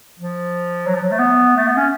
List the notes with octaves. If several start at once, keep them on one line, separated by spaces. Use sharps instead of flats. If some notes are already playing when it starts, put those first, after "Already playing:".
F3
F#3
F3
F#3
A3
B3
A3
B3
C#4